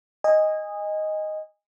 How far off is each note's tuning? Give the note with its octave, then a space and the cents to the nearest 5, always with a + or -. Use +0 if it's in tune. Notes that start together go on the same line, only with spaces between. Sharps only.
D#5 +0 G#5 -25